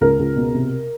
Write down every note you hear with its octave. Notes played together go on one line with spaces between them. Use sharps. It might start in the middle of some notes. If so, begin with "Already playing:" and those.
C#2 A#4
C#2
B2
C3